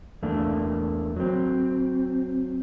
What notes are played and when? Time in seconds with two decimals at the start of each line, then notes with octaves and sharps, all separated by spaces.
0.23 E2 A3 A#3 D4
1.16 F#3 C4